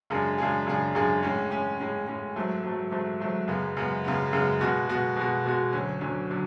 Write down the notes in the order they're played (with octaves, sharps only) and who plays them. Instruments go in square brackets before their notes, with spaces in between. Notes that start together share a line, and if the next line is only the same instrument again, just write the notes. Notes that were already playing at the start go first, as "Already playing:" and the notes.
[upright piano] F#2 C#3 G#3 D4 G#4
F#2 C#3 G#3 D4 G#4
F#2 C#3 G#3 D4 G#4
F#2 C#3 G#3 D4 G#4
A2 G#3 C#4
A2 G#3 C#4
A2 G#3 C#4
A2 G#3 C#4
G#2 F#3 A3
G#2 F#3 A3
G#2 F#3 A3
G#2 F#3 A3
F#2 C#3 G#3 B3
F#2 C#3 G#3 B3
F#2 C#3 G#3 B3
F#2 C#3 G#3 B3
B2 G#3 B3 F#4
B2 G#3 B3 F#4
B2 G#3 B3 F#4
B2 G#3 B3 F#4
D2 D3 F#3 C#4
D2 D3 F#3 C#4
D3 F#3